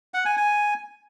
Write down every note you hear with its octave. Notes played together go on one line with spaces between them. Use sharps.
F#5
G#5
G#5